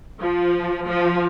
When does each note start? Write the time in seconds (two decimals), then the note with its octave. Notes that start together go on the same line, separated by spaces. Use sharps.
0.20 F3
0.85 F3